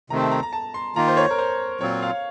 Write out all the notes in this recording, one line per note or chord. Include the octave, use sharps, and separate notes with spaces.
C3 D#3 A3 C4 A#5
A5
A#5
A#5
A5
C6
D#3 A#3 F4 A#5
C5
C#5
A#4
C5
A#2 F#3 C4 F4 C#5
F5